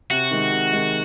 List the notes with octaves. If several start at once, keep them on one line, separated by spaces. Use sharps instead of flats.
C3 F#4
D#3 G#3
C3
D#3 G#3